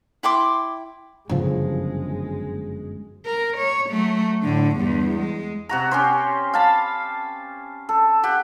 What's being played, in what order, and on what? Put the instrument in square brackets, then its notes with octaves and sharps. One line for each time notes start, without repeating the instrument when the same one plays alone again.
[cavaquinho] E4 G5 C6 D6
[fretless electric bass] G1 F#2 F3 [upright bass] C#3 A#3 [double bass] G#3
[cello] A#4
C#5
F#3 A3
A2 D3
E2 G2
G#3
[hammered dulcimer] C3 F#4 A#5
C#4 G4 C5
F5 A5 B5
A4
G4 F#5